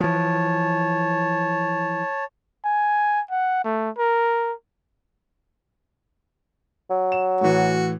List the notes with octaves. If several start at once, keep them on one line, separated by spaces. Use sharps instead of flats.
E3 F3 C#5 A5
G#5
F#5
A3
A#4
F#3
E7
A2 E3 F#4